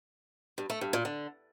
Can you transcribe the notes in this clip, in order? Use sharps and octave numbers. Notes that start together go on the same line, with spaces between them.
G2
A3
G2
A#2
D3